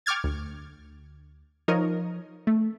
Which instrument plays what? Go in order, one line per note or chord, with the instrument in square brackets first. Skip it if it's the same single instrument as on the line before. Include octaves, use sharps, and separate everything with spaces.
[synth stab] G5 C#6 D6 F6 G#6 A6
D2
F3 D#4 A#4 C#5 D#5
A3